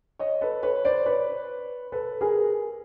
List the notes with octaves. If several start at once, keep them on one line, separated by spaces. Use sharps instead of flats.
C#5 D#5
A4 B4
B4 C#5
C5 D5
B4 C#5
A4 B4
G#4 A#4